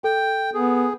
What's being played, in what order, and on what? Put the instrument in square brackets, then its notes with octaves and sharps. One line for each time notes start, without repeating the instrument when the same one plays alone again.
[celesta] A4 [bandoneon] G5
[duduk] B3 [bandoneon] G#4